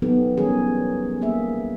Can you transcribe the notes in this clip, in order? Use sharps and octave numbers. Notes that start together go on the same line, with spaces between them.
F#3 B3 D#4 G4 A4
E3 G3 C#4 G#4 A#4
A#3 G#4 E5